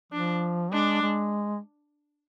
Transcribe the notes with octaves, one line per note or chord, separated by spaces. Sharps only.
F3 D4
G#3 D4
G#3